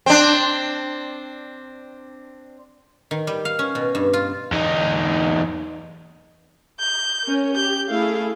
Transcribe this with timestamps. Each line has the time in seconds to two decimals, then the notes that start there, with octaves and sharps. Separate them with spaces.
0.06 C4 D4
3.11 D#3
3.27 G3
3.45 F5
3.59 C#4
3.75 B2
3.95 G2
4.13 F4
4.52 E2 D#4
6.80 G6
7.24 C#4 A#4
7.55 G4 G6
7.89 A3 E4 G#4 F5